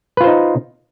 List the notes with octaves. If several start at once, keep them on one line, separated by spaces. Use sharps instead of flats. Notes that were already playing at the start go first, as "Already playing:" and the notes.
D#4 F4 B4 C5